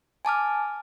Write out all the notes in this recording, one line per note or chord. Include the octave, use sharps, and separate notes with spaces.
G#5 A5 D6 F6